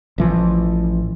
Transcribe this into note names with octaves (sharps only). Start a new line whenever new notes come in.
A1 E3 F3